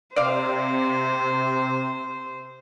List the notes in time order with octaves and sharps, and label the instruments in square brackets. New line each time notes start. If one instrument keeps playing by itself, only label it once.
[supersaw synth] C3 [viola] C5 [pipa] D5 F5